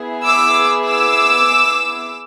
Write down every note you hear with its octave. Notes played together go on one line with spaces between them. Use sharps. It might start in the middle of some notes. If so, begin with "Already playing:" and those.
Already playing: B3 E4 G#4
D6 E6
D6 E6